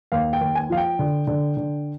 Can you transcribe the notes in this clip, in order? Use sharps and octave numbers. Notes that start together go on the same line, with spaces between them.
D#2 F5
G5
D#2
G#5
F3 F5
G5
D3
D3
D3